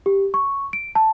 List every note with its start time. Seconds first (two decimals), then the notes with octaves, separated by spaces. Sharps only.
0.06 G4
0.34 C#6
0.73 D7
0.95 A5